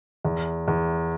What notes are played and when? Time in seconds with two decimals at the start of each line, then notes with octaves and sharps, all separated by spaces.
0.25 E2
0.68 E2